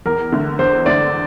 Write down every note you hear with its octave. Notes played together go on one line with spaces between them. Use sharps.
E2 A#4
D3 A3
E2 C5
D3 A3 D5